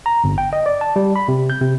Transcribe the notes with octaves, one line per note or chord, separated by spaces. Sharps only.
A#5
G1
G5
D#5
D5
A5
G3
B5
C3
G6
C3